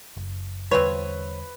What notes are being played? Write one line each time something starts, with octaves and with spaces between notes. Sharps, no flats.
F#1
E2 D3 G3 C4 F4 B4 C#5